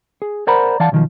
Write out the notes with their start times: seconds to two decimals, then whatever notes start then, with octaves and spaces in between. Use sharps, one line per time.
0.22 G#4
0.47 A#4 C5 D5 F#5 A#5 B5
0.80 E3 D5 F5 F#5 A5
0.92 B1 D#3 F3